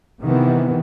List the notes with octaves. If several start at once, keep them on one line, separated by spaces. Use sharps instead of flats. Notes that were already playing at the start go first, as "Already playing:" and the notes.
C3 D#3 E3 B3